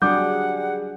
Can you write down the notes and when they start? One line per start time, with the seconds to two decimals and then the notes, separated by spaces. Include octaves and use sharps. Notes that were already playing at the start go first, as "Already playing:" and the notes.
0.02 F#3 G3 D4 G#4 F#5 D6 G6